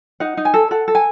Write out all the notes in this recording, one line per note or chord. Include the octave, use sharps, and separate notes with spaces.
D#4 F#5
D#4
G#5
A4
A4 F#5
A4
G#5